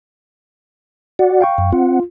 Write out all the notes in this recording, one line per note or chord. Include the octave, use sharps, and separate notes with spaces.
F#4 D5 F#5
F5 G5 C#6
F#2
C4 F4 F#5